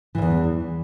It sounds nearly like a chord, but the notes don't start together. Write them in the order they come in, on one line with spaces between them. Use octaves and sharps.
E3 G#2 E2